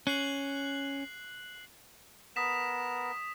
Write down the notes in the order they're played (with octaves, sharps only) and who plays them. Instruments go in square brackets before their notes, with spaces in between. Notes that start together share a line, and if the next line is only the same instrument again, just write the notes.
[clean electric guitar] C#4 [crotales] F#6 C7 F#7
[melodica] B3 A#4 [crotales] D#6 B6 E7